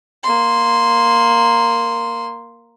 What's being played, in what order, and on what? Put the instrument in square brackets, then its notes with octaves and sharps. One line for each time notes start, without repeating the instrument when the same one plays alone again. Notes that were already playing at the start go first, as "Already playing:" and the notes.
[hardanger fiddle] A#3 C6